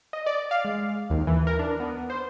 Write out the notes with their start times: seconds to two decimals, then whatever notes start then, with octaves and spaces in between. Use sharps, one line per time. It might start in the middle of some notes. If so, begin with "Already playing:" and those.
0.13 D#5
0.26 D5
0.51 F5
0.65 G#3
1.10 D#2
1.27 E3
1.47 A#4
1.59 D4
1.80 B3
2.10 C5